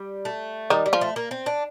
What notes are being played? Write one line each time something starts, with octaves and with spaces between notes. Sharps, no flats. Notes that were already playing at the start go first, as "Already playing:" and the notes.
Already playing: G3
A3
D#3 G3 D#4
G3
F3 F4
A3
A#3
C4
D4